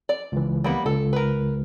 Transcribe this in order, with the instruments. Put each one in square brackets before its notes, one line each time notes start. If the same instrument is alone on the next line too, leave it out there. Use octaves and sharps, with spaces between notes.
[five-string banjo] D5
[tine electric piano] C#2 E3
[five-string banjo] G3 A#3 B3
[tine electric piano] C#2 [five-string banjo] A4
[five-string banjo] A#4 B4